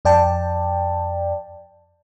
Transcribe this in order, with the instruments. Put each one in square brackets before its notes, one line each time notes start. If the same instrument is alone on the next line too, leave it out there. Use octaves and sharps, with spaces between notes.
[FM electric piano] F2 D5 G5 A5